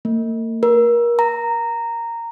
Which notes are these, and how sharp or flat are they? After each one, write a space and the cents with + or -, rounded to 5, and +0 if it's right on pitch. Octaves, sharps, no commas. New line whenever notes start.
A#3 -45
A#4 +30
A#5 -10